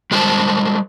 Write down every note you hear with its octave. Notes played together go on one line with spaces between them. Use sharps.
G3 G#3 G#4 A#4 C5 A5